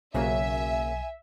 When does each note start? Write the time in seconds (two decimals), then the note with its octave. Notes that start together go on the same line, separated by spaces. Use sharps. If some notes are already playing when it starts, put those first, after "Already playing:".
0.14 B1 C#3 F#3 A#3 E5 G#5